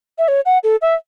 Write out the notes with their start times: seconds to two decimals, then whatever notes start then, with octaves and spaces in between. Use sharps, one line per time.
0.18 E5
0.28 C#5
0.46 F#5
0.64 A4
0.82 E5